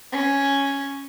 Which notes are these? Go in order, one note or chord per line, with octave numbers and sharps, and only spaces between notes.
C#4